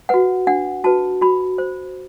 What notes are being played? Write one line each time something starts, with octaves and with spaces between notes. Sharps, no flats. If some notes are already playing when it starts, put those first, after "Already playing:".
F#4 B4 F#5
D4 F#5
F#4 B4 A5
F#4 B5
C5